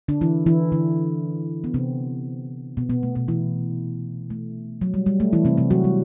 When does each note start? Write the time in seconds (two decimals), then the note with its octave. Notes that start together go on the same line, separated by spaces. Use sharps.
0.08 D3 D4
0.21 E3 E4
0.46 E3 E4
0.72 D3 D4
1.64 B3
1.74 C3 C4
2.77 B2 B3
2.90 B2 B3
3.03 A3
3.15 B2 B3
3.28 E3 E4
4.30 A3
4.81 F#3
4.94 G3
5.06 G3
5.20 A3
5.33 E3 E4
5.45 C3 C4
5.57 C3 C4
5.71 F#3 F#4
5.84 G3